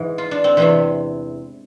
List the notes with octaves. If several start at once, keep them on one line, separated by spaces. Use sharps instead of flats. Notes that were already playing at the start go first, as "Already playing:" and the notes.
Already playing: G#2 E3
F4
D4
C4
E2 C3 E3 C4